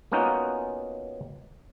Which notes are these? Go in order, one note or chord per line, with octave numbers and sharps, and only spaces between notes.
A#3 B3 C#4 D#4 F4 F#4